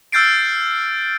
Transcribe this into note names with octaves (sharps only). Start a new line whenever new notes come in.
E6 F6 G6 A6 C7 D7